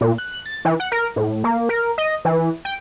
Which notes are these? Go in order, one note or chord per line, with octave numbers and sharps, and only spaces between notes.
A#2
F#6
A6
E3
F#5
A#4
A2
A#3
A#4
D#5
E3
G5